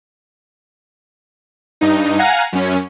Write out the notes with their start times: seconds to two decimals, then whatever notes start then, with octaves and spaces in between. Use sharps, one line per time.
1.81 G2 D#4
2.19 F5 F#5 G#5 A#5
2.53 F#2 C#4